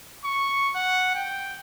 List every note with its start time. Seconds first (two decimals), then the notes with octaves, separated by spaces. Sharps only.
0.25 C#6
0.75 F#5
1.15 G5